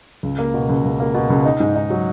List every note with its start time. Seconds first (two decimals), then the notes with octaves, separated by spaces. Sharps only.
0.23 C#2
0.39 A#3
0.54 B2
0.69 C#2
0.84 C#2
1.00 A#3
1.14 B2
1.30 C#2
1.45 D#4
1.60 G#2
1.76 D#4
1.90 F#3